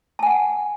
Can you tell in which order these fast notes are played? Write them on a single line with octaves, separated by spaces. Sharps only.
A5 G#5 F#5